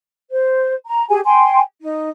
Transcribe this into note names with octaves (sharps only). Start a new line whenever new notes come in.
C5
A#5
G4 G#4 G#5
G5 G#5 C6
D#4